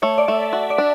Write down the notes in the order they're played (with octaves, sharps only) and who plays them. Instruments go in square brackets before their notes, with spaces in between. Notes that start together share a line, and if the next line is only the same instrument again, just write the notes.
[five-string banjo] A3 [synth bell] C#5
[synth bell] D5
[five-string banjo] A3 [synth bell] E5
[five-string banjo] F#4
[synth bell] D5
[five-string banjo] D4